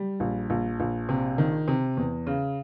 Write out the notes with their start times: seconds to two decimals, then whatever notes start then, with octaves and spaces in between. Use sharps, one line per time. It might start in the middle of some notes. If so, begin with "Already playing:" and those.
Already playing: G3
0.20 A#1
0.50 A#1
0.80 A#1
1.09 C3
1.38 D#3
1.68 C3
1.97 E2
2.27 C#3